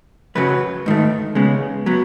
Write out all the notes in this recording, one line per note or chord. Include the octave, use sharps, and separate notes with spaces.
F#2 C#3 F#3 B4
G#2 D#3 A3
C#3 G#3 B3
F#3 B3